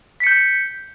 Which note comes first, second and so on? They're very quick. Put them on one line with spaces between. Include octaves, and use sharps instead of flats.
B6 C#7 G6